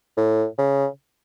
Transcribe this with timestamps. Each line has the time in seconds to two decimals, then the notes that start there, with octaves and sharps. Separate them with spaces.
0.17 A2
0.58 C#3